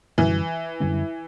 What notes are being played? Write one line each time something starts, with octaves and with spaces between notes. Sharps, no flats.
F#2 D3 E3 G3 C#4
F#2 D3 G3 C#4